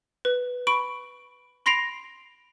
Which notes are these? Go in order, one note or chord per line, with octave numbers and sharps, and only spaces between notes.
B4
B5 C#6 D7
B5 C6 A#6 C7 D7 F7